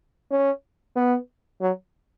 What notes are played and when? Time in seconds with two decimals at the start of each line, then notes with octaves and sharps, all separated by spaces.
0.31 C#4
0.96 B3
1.61 F#3